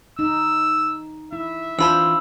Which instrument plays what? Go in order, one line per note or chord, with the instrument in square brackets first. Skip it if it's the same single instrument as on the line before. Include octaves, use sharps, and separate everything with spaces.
[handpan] D#4 [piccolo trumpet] E6
[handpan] E4 [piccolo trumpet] E5
[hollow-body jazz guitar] E3 F4 [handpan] D4 C5 [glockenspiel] A5 B5 E6